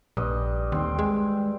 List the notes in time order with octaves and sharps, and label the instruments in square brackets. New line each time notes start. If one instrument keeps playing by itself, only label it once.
[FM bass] A#1 [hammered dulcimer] G2 D#5 D6
[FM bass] D#2 [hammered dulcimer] C4 G5
[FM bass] G#3